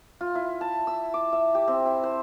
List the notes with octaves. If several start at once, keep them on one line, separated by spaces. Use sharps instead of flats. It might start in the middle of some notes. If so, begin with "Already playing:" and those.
F4
E4
A5
E6
D6
E5
G4
C4
E4
C5